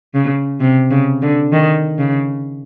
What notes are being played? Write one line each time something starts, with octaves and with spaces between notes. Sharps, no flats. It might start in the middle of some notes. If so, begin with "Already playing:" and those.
C#3
C3
C#3
D3
D#3
C#3